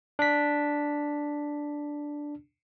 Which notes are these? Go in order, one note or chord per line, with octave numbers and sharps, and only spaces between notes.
D4 B6